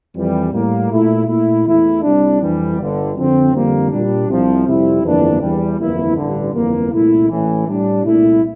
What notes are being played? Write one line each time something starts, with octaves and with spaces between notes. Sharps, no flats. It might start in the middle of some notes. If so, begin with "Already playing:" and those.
F2 E3 G3
A2 G3 A#3
A#2 A3 E4
A#2 A3 E4
E2 E3 A3 E4
C2 C3 G3 D4
F2 E3 G3
G1 G2 D3
F2 D3 F3 C4
F2 D3 G3 A#3
A#2 G3 D4
C2 C3 F3
F2 C3 G3 C4 E4
G1 F2 E3 A#3 D4
E2 E3 G3
G1 F2 E3 A#3 E4
A1 G2 D3
G1 F2 E3 A#3
C2 A#2 A3 E4
A1 A2 E3
A2 G3 D4
C2 A#2 A3 E4